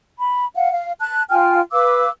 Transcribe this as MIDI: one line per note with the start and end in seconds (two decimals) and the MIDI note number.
0.19 0.47 83
0.55 0.71 77
0.55 0.71 78
0.72 0.92 77
1.00 1.22 81
1.00 1.22 90
1.30 1.61 65
1.30 1.61 79
1.30 1.61 80
1.30 1.61 89
1.72 2.09 71
1.72 2.09 77
1.72 2.09 86
1.72 2.09 88